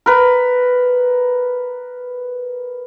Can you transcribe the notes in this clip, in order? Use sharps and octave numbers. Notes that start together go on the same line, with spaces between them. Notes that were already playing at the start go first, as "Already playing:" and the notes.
A#4 B4